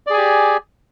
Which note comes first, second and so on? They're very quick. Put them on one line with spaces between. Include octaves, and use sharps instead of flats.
D5 G#4 G#5 G4